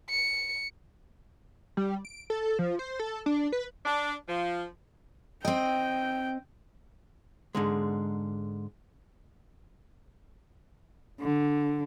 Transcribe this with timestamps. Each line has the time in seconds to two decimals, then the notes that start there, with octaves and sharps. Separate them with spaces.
0.10 C#7
1.77 G3
2.05 D7
2.30 A4
2.59 F3
2.79 C5
2.99 A4
3.26 D4
3.52 B4
3.85 D4
4.27 F3
5.45 C4 D#5 G5
7.55 G#2 D3 G#3
11.20 D3